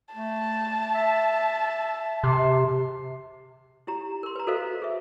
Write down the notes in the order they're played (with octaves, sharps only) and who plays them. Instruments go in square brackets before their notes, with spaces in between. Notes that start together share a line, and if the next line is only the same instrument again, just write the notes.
[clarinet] A3 [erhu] A5
[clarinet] E5
[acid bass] C3 [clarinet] C6
[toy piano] E4 G4 A#5
A#4 C6
B4 A#5
F#4 A4 A#4 C5 D#5 F5
G#4 E5